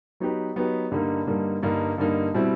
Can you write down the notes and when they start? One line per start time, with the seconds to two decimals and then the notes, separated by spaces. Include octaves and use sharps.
0.20 F#3 B3 D#4 G4 B4
0.56 F#3 B3 D#4 G4 B4
0.91 G2 D3 G3 A#3 D#4
1.27 G2 D3 G3 A#3 D#4
1.62 G2 D3 G3 A#3 D#4
1.98 G2 D3 G3 A#3 D#4
2.34 B2 G3 C4 E4